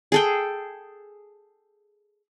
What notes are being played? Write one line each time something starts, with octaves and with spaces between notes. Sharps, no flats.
G#4 A4 G5